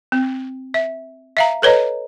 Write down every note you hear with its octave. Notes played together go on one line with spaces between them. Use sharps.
C4
E5
E5 F5 A#5
A4 B4 C#5 D#5 A#5